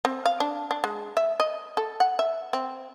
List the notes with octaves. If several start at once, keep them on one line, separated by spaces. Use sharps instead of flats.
C4
F5
D4
D4
G#3
E5
D#5
A4
F#5
E5
C4